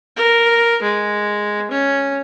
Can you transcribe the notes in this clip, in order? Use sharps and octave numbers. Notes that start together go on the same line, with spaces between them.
A#4
G#3
C#4